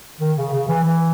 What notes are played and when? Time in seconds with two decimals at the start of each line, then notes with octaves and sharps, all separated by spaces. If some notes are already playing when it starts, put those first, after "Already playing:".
0.20 D#3
0.37 C#3
0.53 C#3
0.68 E3
0.84 E3